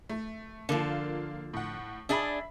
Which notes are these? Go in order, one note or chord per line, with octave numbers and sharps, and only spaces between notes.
A3
D3 F3 A#3 F4
A2 F#5
D4 G#4 D5 E5 B5